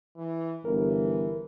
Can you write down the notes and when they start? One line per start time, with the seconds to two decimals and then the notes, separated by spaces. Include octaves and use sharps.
0.17 E3
0.65 G1 E3 A#4